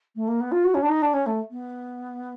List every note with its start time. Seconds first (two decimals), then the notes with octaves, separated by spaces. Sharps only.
0.15 A3
0.28 A#3
0.40 B3
0.51 F4
0.64 F#4
0.74 C#4
0.82 D4
0.89 D#4
1.02 D4
1.13 C#4
1.26 A3
1.51 B3